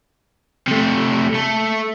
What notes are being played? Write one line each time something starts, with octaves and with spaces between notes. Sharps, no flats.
C3 A3
A3